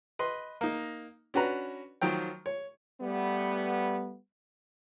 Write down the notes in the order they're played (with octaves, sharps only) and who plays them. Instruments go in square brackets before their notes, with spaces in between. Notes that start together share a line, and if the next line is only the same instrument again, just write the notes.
[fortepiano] B4 D#5 C6
A#3 D#4
C#4 D4 F#4 B4 A#5
D#3 F3 F#3 G5
C#5
[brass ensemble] G3 A3 B3